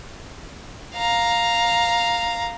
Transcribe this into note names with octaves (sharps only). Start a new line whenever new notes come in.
F5 A#5